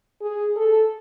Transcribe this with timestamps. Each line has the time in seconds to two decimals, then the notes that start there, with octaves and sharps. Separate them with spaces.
0.21 G#4
0.57 A4